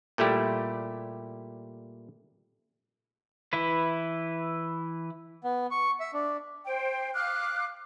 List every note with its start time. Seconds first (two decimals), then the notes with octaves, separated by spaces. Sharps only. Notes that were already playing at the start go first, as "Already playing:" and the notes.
0.18 A#2 G3 A3 E4 G4
3.53 E3 E4 B4
5.44 B3
5.71 C#6
6.00 E5
6.13 D4
6.65 C5 G5
7.15 F5 D6 F6 F#6